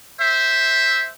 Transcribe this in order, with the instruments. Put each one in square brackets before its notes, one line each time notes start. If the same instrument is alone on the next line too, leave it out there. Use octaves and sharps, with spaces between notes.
[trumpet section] C5 E5